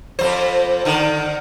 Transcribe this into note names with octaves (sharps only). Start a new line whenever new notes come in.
F2 F#3 C5
D3 D#3